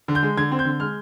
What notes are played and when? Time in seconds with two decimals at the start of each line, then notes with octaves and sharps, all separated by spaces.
0.08 D3
0.15 G6
0.23 G#3
0.37 D3 G#6
0.52 C4
0.59 G6
0.65 D3
0.80 G#3 F6